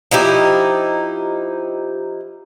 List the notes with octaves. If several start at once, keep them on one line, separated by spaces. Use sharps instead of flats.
F3 D#4 E4 G4